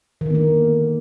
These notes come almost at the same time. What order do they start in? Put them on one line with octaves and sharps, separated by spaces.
D#3 D3 B3 A#3